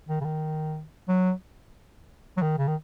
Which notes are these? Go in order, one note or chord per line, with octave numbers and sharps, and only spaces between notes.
D#3
C#3
D#3
F#3
F#3
D#3
C#3
D#3